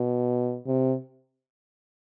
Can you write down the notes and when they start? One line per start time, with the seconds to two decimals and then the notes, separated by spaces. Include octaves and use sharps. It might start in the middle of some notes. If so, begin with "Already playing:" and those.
Already playing: B2
0.67 C3